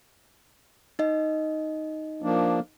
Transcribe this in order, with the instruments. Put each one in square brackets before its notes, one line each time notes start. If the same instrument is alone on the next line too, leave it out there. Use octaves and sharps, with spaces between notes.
[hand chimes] D#4 D#5
[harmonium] F3 A#3 D4